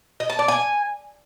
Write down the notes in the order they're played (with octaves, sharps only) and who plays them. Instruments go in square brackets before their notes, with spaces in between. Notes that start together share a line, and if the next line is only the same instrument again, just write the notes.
[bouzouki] D#5
A5
D5
G#5